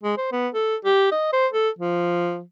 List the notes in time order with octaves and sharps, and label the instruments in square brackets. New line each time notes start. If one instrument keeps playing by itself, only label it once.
[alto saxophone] G#3
C5
B3
A4
G4
D#5
C5
A4
F3